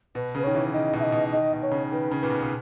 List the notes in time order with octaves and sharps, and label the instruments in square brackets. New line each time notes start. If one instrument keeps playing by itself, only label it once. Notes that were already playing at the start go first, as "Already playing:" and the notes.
[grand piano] B2 [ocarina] B4
[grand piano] C#3 [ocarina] B4
[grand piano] D#3 [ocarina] C#5
[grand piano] E3
[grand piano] D#3 [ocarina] D#5
[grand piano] B2
[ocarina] E5
D#5
[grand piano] B2
[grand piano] D#3 [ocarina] D#5
[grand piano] B2
[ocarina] C#5
[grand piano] C#3
[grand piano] D#3 [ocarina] B4
[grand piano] C#3
[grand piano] A#2 [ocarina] B4
[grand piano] B2
B2